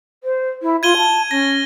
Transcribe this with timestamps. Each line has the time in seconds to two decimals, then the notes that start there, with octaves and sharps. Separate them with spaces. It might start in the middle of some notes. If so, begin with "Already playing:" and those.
0.24 C5
0.62 E4
0.83 F4 G#6 D#7 G7
0.97 A5
1.31 C#4 A#6